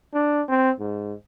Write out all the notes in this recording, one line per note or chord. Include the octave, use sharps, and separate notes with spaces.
D4
C4
G#2